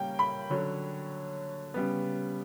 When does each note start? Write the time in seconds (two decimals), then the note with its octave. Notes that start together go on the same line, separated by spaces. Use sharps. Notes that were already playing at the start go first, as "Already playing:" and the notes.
Already playing: C#3 G3 A#3 C#4 G5
0.19 B5
0.50 D3 F#3 C#4
1.74 C#3 G3 B3